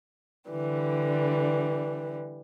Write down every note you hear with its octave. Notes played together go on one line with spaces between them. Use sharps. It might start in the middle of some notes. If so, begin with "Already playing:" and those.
D3 E3 G3